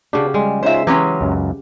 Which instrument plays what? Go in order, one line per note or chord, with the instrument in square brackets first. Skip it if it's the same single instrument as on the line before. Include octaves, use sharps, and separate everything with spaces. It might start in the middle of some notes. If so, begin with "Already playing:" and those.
[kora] C#3 F#4 G4 [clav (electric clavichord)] D4 D5
[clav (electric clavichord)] G3 G4 [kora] G#3
[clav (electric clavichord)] C#4 D#4 F4 [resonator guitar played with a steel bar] C5 E5
[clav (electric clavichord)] E3 [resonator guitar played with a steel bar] F#3 G#3 C#4 [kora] G4
[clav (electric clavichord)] C#2 F#2